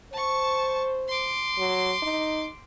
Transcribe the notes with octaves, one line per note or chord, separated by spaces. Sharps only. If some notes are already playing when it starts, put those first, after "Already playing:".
C5 A5 C#6
C6 D6
F#3
D#4